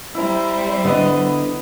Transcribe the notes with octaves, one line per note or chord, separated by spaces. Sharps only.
G3 C4 E4 A#5
D3 B3 D#5